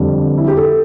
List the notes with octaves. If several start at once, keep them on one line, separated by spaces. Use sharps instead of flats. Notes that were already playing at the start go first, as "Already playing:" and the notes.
Already playing: F2 D3 G3
E4
G4
A4